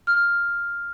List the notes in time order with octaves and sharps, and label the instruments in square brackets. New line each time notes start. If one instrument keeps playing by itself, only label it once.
[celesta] F6